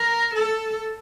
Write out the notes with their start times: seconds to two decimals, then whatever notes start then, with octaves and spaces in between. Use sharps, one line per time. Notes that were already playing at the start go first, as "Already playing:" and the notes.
Already playing: A#4
0.35 A4